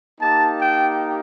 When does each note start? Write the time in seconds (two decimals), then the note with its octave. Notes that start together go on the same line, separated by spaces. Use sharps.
0.20 A#3 D#4 G4 A5
0.61 G5